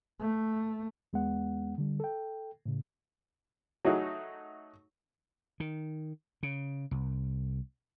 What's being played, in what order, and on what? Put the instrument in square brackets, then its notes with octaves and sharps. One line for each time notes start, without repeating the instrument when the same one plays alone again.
[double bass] A3
[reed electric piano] E2 G#3 B3 F#5
D3 G3
A4 G5
A2 C#3
[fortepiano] F#3 A3 D#4 F#4 G#4
[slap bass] D#3
C#3
C2